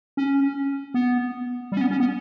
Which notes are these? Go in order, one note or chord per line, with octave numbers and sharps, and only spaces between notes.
C#4
B3
G3
C#4
B3
C#4
B3